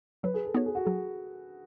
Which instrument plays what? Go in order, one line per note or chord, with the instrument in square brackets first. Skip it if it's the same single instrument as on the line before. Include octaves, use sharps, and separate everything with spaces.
[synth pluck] F#3 [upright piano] B4
[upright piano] G#4
A4
[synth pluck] B3 D#4 F#4 C#5
[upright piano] G#4
F#4
[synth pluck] F#3 [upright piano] G#4